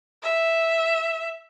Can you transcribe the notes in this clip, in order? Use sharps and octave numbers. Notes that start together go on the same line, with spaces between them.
E5